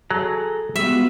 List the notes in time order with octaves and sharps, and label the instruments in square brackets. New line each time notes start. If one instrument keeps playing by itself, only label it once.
[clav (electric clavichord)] F#3 [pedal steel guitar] G#4 A4 A#5
[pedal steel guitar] G3 G#3 B4 [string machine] B3 F4 F#4 [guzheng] E5